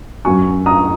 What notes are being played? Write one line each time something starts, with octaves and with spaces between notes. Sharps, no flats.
F#2 F#3 G#5 C#6
A#5 D#6